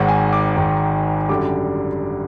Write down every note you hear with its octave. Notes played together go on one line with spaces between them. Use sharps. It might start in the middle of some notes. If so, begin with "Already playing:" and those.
Already playing: G#1 G#2 D#3 F#5
G#5
D6
G#1 G#2 D#3
F#2 D3 G3 D6